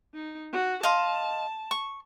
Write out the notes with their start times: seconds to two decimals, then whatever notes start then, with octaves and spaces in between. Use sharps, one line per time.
0.14 D#4
0.53 F#4
0.83 D#5 F5 A5 C6
1.71 C#6